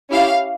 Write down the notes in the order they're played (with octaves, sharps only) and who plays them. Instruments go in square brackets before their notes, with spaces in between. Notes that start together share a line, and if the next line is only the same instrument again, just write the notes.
[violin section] C#4 E4 G4 F5